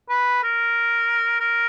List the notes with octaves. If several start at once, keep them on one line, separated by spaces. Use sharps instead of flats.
B4
A#4
A#4